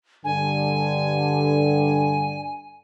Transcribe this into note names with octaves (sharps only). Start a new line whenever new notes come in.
G2 D3 G#5